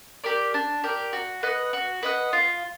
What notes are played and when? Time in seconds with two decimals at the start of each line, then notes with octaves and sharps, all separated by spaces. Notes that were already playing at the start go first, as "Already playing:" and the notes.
0.24 G4 A#4 D5
0.54 D4
0.84 G4 A#4 D5
1.13 F#4
1.43 B4 D#5 F#5
1.73 F#4
2.03 B4 D#5 F#5
2.33 F4